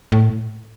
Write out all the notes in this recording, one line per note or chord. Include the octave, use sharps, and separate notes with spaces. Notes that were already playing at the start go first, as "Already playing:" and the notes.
A2